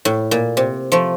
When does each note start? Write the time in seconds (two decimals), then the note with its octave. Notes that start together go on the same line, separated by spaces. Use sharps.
0.05 A2
0.31 A#2
0.57 C3
0.92 F3 A3